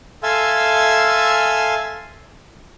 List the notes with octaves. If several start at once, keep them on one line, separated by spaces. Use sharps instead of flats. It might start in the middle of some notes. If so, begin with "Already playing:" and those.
A4 E5 F5 G#5 C6 E6